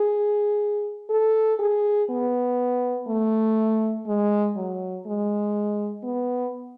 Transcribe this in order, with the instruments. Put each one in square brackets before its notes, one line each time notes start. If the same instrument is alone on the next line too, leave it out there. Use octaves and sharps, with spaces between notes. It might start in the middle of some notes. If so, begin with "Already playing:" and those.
Already playing: [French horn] G#4
A4
G#4
B3
A3
G#3
F#3
G#3
B3